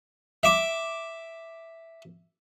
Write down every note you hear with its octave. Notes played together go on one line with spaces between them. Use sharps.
E5 D6